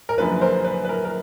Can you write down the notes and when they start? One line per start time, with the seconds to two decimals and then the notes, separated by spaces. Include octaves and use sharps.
0.09 A#4
0.17 F#1 F#2 D3 F3 B4
0.41 A#4 C5
0.65 B4
0.85 B4
0.89 A#4
1.05 A#4